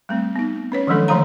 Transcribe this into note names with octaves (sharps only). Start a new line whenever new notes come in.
G3 A3 C4
B3 D#4
C#4 B4 C#5
D#3 F3 F#3 G#3 D4 A4
D3 D#3 F3 A3 F5 A#5